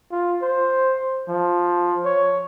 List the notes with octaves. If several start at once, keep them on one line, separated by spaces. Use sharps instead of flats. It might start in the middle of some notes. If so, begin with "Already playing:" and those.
F4
C5
F3
C#5